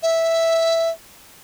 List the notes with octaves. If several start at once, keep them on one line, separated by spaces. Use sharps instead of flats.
E5